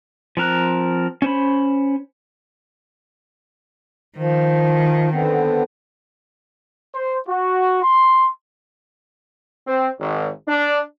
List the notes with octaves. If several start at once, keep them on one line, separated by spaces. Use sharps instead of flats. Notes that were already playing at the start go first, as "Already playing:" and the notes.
F3 C4 A#4 F#6
C#4 C5 B5
D#3 F3
D3 B3 C4
C5
F#4
C6
C4
G#1
D4